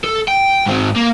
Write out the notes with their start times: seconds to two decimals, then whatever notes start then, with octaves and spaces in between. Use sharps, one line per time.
0.04 A4
0.28 G5
0.67 G#2 C4
0.96 A#3